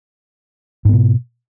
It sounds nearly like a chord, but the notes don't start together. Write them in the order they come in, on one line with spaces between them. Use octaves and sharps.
G#2 B3 B2